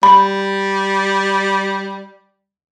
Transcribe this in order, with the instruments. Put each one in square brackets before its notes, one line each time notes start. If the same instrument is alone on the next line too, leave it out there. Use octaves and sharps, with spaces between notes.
[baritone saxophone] G3 [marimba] B5